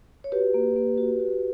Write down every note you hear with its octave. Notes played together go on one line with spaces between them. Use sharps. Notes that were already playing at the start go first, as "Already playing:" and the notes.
C#5
F#4 G4 B4
A#3
A#3
F#4
F#4